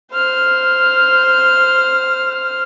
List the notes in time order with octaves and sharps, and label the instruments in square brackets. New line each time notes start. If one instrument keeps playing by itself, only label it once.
[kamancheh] C5 F6